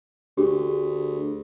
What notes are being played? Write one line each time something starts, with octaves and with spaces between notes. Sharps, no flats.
D2 G4 G#4